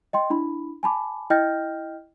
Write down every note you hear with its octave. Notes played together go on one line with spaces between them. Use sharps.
D#5 G5 C6
D4 E4 B5
G#5 A5 B5 D6
E4 D#5 G5 F6 G6 A#6